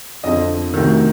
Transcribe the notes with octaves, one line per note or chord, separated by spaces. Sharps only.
F2 D3 F3 D#5
D2 C3 D#3